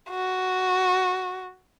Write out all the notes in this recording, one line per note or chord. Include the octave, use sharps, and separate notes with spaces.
F#4